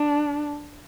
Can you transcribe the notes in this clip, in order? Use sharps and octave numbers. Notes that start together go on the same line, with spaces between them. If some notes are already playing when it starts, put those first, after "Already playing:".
Already playing: D4